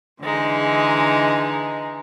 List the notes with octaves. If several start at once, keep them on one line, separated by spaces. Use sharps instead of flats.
D3 E3 G#3 D#4